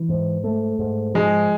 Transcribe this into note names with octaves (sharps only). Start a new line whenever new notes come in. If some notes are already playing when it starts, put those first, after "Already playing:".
Already playing: E3
G#2
A3
G#2
F3 G#3